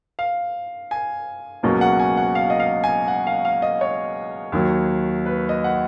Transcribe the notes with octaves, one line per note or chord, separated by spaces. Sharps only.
F5
G#5
C#2 B2 F#3 A#3 C#4
F#5
G#5
F#5
F5
D#5
F5
G#5
F#5
F5
F5
D#5
C#5
D#2 D#3 F#3
B4
D#5
F#5